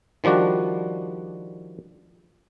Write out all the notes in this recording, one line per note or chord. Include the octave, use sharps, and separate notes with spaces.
D#3 F3 G3 D4 F#4